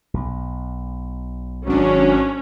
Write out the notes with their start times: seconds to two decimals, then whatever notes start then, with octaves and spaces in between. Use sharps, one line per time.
0.14 B1
1.66 G#1 F#3 C#4 D4